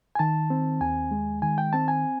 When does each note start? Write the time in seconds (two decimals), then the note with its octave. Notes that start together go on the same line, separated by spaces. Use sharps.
0.15 G#5
0.19 D#3 A5
0.50 C4
0.81 D#2 G#5
1.11 G#3
1.42 D#3 G#5
1.58 G5
1.73 C4 A5
1.88 G#5